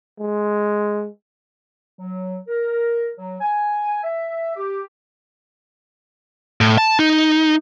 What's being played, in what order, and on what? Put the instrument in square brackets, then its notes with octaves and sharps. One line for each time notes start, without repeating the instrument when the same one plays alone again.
[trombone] G#3
[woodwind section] F#3
A#4
F#3
G#5
E5
G4
[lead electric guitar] A2
A5
D#4